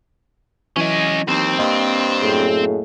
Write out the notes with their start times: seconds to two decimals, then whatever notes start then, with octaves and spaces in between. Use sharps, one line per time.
0.77 E3 F#3 C#4 D#5
1.28 D#2 C4
1.59 G2 A#3 D#5 F5
2.21 F#2 A2 G#4